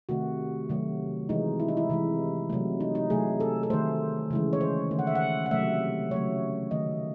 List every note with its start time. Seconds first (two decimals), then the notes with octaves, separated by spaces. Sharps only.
0.09 C3 D#3 A3 F#4
0.69 C3 D#3 F#3 A3
1.29 C3 E3 G#3 D#4
1.60 E4
1.68 D#4
1.77 E4
1.90 C3 E3 G#3
2.50 C3 F#3 A3
2.80 D#4
2.95 D#4
3.10 C3 F#3 A3 G#4
3.40 A4
3.63 A4
3.70 D#3 A3 C5
4.31 C#3 E3 G#3
4.53 C#5
4.61 C5
4.91 D#3 A3
4.99 F#5
5.07 E5
5.15 F#5
5.46 F#5
5.51 C3 F#3 A3 E5
6.11 C#3 F#3 A3 C#5
6.71 D#3 A3 D#5